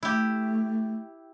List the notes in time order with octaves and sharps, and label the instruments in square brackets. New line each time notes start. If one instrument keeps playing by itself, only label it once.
[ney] A3 [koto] E4 G4